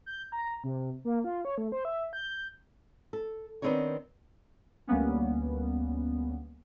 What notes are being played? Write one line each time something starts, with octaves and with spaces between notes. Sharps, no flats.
G6
A#5
C3
A#3
F4
C#5
A3
C5
E5
G6
A4
D#3 B3 C4 D4 D#4 C#5
D2 G3 A#3 B3 C#4